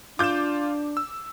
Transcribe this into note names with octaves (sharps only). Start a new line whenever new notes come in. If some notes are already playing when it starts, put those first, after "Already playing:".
D4 F4 D6 G6 E7
E6